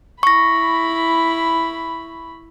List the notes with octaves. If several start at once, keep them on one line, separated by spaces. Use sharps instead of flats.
E4 B5 C#6 A#6